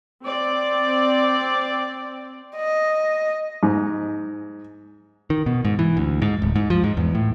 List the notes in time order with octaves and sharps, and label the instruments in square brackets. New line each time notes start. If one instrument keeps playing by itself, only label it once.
[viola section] C4 D5
[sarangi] D#5
[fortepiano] G#2
[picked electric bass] D#3
B2
G#2
E3
D2
G#2
D1
G#2
F3
G#2
E2
A2